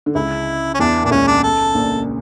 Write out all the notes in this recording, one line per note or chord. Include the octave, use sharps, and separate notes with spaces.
D3
C#2 C#3 E4
C#4
E2 E3 D4
A#2 D4
C#2 C#3 C#4
D4
A4
A#1 A#2